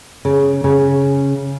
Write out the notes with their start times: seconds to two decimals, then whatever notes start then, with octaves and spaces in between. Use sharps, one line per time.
0.25 C#3
0.64 C#3